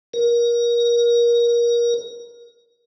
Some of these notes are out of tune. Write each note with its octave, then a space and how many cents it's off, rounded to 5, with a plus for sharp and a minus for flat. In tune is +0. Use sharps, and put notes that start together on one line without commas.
A#4 +25